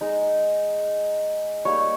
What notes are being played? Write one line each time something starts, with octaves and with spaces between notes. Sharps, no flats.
G#3 D#4
G3 A#3 D#4 C#5